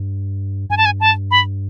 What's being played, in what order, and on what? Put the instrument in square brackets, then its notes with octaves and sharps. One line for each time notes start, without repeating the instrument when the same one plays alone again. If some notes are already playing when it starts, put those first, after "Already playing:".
Already playing: [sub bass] G2
[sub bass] G2 [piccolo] G#5
[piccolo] A5
G#5
A5
B5